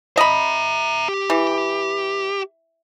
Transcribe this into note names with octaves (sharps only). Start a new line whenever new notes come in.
D#5 E5 A#5 B5
G4
E3